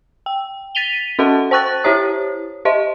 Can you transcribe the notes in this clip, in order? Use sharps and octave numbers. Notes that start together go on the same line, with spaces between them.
G5
A6 B6 D#7 F7 G7
C#4 F#4 A4 D#5 E5 A5
C5 G5 C#6 F#6 A6
E4 G4 C5 C#5 D#6
G4 C5 D#5 E5